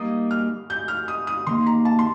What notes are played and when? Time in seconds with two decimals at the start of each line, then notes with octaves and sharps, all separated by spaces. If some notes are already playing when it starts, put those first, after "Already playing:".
Already playing: G3 A#3 D#4 D#6
0.31 F6
0.70 G6
0.88 F6
1.08 D#6
1.27 D#6
1.47 D#3 A#3 D#4 C6
1.67 A#5
1.85 A5
1.99 C6